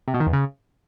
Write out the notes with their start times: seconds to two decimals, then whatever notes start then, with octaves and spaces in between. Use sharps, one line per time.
0.08 C3
0.14 B2
0.20 D#3
0.27 E2
0.33 C#3